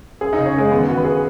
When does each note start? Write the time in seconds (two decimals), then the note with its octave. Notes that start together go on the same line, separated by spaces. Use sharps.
0.21 F#2 G#4
0.33 C#3 D#4
0.46 C#4
0.55 F#2 G#3
0.71 D#3 B3
0.88 D#3 F#4
0.97 B4
1.04 G#4